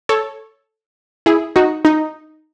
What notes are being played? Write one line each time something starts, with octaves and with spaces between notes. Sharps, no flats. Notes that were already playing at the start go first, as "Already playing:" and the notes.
A4 C#5
E4 G#4
D#4 F#4
D#4